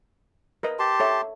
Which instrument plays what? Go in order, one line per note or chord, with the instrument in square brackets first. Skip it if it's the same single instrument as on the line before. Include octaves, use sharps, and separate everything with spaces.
[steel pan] A#4 B4 D#5
[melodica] G4 A5 C6
[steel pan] A4 C#5 E5